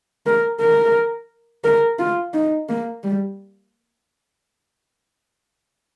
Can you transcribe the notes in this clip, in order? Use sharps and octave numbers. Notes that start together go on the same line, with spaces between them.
A#4
A#4
A#4
F4
D#4
A#3
G3